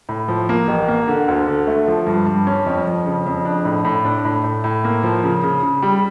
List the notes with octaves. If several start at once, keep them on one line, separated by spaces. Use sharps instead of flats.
A2
F3
A#3
A1
A#3
D3
D2
D3
A3
F3
G2
G2
C#4
F2
F2
C#3
F2
D4
A2
A2
D4
A2
A2
A2
A#3
F3
C#3
C#3
C#3
G3